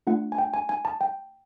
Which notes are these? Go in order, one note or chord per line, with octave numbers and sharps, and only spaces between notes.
A3 D4 F4 F#5
G#5
G5
G#5
G#5
A5
G5